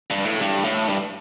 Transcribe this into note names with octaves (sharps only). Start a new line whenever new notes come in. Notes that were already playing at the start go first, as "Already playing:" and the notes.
G2
A2
G2
A2
G2